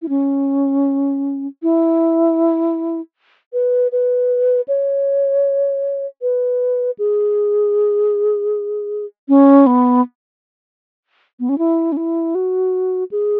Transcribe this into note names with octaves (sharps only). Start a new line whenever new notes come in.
E4
C#4
E4
B4
B4
C#5
B4
G#4
C#4
B3
B3
C#4
E4
C#4
E4
F#4
G#4